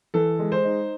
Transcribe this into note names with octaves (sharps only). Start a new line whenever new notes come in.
E3 A4
G#3
C5
D#4